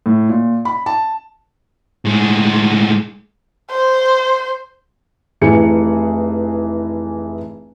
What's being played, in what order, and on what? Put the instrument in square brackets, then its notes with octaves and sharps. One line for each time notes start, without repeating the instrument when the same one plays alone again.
[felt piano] A2
A#2
B5
A5
[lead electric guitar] A2 G#3
[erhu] C5
[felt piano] F1 E3 G#4 C#7